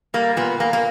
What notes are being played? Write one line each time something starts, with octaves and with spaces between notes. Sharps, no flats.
G3 A#3
A#2 B3
A#2 A#3
A#3